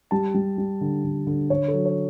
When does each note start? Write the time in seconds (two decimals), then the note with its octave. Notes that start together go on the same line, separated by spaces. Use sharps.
0.11 G3 A5
0.34 G3
0.58 G3
0.81 D3
1.04 D3
1.27 D3
1.50 D3 C#5
1.68 A4
1.74 F#3
1.86 C#5